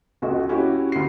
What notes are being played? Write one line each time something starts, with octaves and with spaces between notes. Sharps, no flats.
C#2 F#4 A4 D#5
C#4 E4 F#4 G4
D2 C7